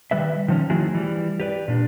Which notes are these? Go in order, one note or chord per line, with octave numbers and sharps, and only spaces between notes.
D#3 G3 B4 E5
D#3 F3 C#4
D#3 F3 A3 E4 F#4 G#4
E3 G3
G4 B4 D5
A#2 D4